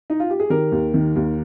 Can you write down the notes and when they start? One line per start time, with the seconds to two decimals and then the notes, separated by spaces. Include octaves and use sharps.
0.10 D#4
0.20 F4
0.30 G4
0.40 G#4
0.50 D#3 G4 A#4
0.72 D#2
0.94 D#3
1.16 D#2